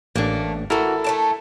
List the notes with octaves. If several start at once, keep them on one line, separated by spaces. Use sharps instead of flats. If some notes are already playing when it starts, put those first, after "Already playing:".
A1 A3 A#3 D4
E3 E4 F#4 A4 A#4
A3 D5 A5